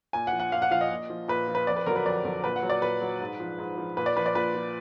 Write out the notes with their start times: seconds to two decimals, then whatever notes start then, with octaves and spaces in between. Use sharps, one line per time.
0.13 A#2 G#5
0.27 F#5
0.33 F3
0.40 F#5
0.52 A#2 F5
0.62 F#5
0.71 F3 F5
0.81 D#5
0.90 A#2
1.10 F3
1.28 A#2 B4
1.48 F3
1.55 B4
1.67 F2 D5
1.76 B4
1.86 D3 F#3 A#4
1.96 B4
2.05 F2 D5
2.25 D3 F#3
2.43 A#2 B4
2.56 F#5
2.63 F#3
2.70 D5
2.82 A#2 B4
3.01 F#3
3.21 G#2
3.40 F3
3.59 G#2
3.78 F3
3.97 A#2 B4
4.06 D5
4.16 F3 B4
4.26 D5
4.35 A#2 B4
4.55 F3